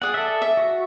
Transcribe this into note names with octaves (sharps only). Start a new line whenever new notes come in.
G#4 D5 F#5
A4 E5
E5
F#4